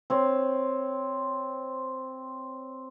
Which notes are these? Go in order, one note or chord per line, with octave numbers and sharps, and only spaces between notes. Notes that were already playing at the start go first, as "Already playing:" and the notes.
C4 C#5